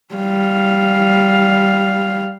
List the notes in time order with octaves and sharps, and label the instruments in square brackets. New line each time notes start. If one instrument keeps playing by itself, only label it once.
[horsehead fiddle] G3 F5